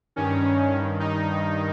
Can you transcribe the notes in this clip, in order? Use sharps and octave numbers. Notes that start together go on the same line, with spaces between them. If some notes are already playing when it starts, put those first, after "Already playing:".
G2 D#3 C#4
D#4